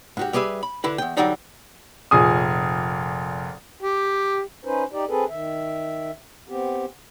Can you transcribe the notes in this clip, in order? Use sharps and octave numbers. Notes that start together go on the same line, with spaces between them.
G#2 F#4 G4
G3 G4 G#4 B4 E5
B5
D3 E4 B4
E2 G5
D3 F#3 G3 D4 D#4 D5
F1 A#2 G#4 G#5 D#6
G4
C#4 D#4 B4 C5
D#4 G4 D5
C4 G#4 A4 B4
D#3 E5
B3 C4 G4